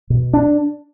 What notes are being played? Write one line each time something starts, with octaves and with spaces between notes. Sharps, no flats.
B2
D4